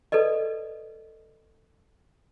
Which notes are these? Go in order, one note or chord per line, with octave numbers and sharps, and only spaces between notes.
A4 B4 D5 D#5